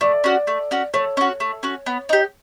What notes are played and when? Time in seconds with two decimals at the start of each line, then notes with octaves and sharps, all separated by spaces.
0.01 A3 D5
0.24 C#4 F#4
0.47 A3
0.71 C#4 F#4
0.94 A3 C#5
1.17 C#4 F#4
1.40 A3
1.63 C#4 F#4
1.86 B3
2.09 D#4 G4